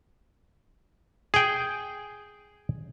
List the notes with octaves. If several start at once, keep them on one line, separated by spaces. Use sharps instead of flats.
G#4 G5